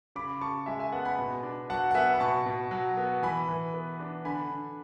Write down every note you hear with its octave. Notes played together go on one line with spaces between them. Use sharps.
C#3 B5 D6
C#3 A5 C#6
G#3 E5 G#5
E5 G#5
B3 F#5 A5
G#5 B5
B2
D4
F#3 F#5 A5
F#5
B3 E5 G#5
B5
B2 A5 C#6
B2
F#3
B3
E3 G#5 B5
E3
B3
D4
D3 G#5 B5
D3